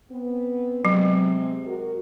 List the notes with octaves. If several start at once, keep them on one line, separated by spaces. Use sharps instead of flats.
B3 C4
C3 F#3 G#3 C4
F#4 A#4